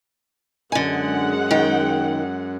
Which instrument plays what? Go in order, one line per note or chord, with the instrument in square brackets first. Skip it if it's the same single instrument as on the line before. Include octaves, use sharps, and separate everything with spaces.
[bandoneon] F#2 [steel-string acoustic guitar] D3 G#5 [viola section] G#3 F#5
[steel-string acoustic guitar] D#3 G5